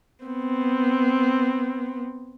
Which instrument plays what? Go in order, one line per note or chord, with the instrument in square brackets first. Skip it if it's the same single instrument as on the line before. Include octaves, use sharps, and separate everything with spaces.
[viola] B3 C4